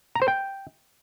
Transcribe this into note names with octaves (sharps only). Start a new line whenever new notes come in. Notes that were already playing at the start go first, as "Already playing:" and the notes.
A#5
C5
G5